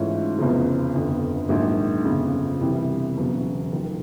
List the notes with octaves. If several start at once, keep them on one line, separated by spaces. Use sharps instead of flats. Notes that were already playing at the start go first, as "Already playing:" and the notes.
Already playing: G#2 E3 A3 C#4 F4
F1 E2 C#3 F3
G1 F2 D3
A#1 G#2 D#3 F#3
G1 F2 C#3
C2 C3 E3 G3
E1 E2 C#3 F#3
F1 F2 C3 D#3 F#3